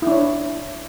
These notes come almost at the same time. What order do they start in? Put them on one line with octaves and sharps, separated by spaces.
E4 D4 C#5